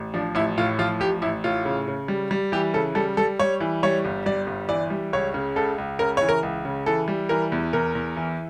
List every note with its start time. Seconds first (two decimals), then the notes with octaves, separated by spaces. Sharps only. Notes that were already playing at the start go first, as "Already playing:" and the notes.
Already playing: A1
0.14 F3 D4
0.35 A1 E4
0.58 A2 F4
0.79 F3 F4
1.00 A1 G4
1.22 A1 E4
1.44 A2 F4
1.65 C#3
1.88 C#3
2.08 G3
2.31 G3
2.52 E3 G4
2.73 C#3 A4
2.95 G3 A4
3.17 G3 A4
3.39 G3 C#5
3.60 E3
3.83 G3 C#5
4.05 G1
4.26 G3 D5
4.47 G1
4.69 E3 D5
4.90 G3
5.13 C#2 C#5
5.34 C#3
5.56 C#2 A4
5.78 C#2
5.99 C#3 A#4
6.17 E3 C#5
6.29 A#4
6.43 C#2
6.65 C#3
6.86 E3 A4
7.08 G3
7.29 E3 A#4
7.52 E2
7.73 E2 A#4
7.95 E2
8.17 E3